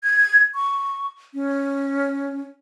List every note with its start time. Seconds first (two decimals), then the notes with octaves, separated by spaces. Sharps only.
0.04 G#6
0.55 C#6
1.34 C#4